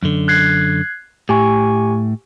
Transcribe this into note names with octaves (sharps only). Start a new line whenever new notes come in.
F#2 D3
F#6 G#6 C7
A2 G4 G#5 C#6